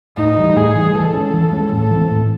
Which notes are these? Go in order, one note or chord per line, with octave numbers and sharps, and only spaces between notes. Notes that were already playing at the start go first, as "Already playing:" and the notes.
A2 D#4
E3 G3
A2 G#4
E3 G3
E3 A4
G#3 C#4
E3
G#3 C#4
A2 A4
E3 A3 C4
A2